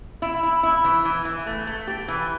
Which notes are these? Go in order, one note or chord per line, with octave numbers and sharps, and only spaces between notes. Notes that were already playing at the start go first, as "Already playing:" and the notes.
E4
E4
E4
E3
E3
E3
A3
A3
G4
E3